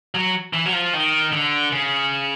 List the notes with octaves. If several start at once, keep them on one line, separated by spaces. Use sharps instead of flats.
F#3
E3
F#3
F3
D#3
D3
C#3